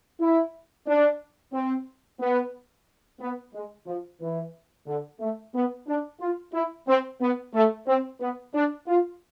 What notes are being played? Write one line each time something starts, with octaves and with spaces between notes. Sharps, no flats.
E4
D4
C4
B3
B3
G#3
F3
E3
D3
A3
B3
D4
F4
E4
C4
B3
A3
C4
B3
D4
F4